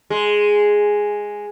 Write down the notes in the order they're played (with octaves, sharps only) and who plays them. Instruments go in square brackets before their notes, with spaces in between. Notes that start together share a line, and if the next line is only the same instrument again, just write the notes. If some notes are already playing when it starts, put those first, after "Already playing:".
[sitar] G#3